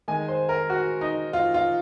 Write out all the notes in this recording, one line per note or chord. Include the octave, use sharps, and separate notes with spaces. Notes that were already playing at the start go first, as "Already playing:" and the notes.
D#3 G#3 G#5
C5
A#4
F#4
D#4
F4
F4